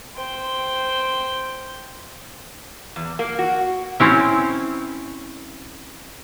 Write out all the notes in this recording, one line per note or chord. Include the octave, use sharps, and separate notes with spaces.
C5 G5
E2
A#3
F#4
C4 C#4 E4